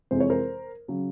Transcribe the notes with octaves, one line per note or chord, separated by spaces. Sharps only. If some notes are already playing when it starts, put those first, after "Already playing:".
F2 C3 E3 G#3 C4 C5
C#5
A#4 C5
C#3 F#3